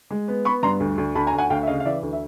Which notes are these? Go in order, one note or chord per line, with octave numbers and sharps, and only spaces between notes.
G#3
B3
B3 B5 C#6
G2 A#5 C6
D2
D2
D2 A5 B5
G#5 A#5
D2
F#5 G#5
D2 F5 G5
E5
C#3 D#5 F5
F5
E3 D5 E5
D2
E5